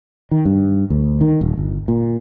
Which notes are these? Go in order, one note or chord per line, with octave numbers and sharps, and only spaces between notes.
D#3
G2
D2
D#3
D#1
G1
A#2